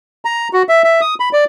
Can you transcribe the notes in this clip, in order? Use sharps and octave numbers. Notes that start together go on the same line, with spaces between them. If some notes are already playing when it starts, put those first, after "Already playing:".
A#5
F#4
E5
E5
D#6
B5
D5